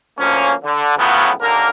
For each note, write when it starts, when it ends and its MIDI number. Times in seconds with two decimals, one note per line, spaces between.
0.18 0.52 38
0.18 0.52 53
0.18 0.52 58
0.18 0.52 61
0.64 0.96 50
0.97 1.30 45
0.97 1.30 49
0.97 1.30 53
0.97 1.30 54
0.97 1.30 59
1.40 1.69 39
1.40 1.69 50
1.40 1.69 58
1.40 1.69 70